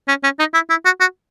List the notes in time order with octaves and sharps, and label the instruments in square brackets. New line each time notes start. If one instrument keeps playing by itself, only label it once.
[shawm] C#4
C#4
D#4
E4
E4
F#4
F#4